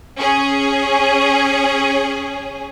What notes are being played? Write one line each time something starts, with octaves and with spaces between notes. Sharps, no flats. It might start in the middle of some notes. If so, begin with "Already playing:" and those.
C#4 G#4